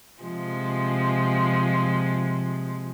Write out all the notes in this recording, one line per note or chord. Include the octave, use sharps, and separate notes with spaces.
C3 F3 G#3